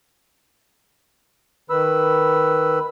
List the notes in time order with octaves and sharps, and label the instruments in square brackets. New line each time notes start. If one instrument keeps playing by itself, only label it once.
[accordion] D#3 B4 B5 E6